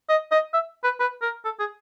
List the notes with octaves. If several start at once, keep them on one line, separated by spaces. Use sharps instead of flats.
D#5
D#5
E5
B4
B4
A#4
A4
G#4